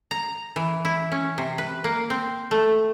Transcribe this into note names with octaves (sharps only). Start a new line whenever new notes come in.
A#5
E3
E4
C#4
C3
B4
A#3
C4
A3